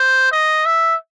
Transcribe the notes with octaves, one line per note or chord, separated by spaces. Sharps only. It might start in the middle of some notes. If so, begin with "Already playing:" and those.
Already playing: C5
D#5
E5